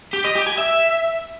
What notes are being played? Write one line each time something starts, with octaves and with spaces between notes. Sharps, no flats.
G4
D#5
G4
G#5
E5